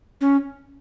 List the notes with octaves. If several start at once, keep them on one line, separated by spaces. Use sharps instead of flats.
C#4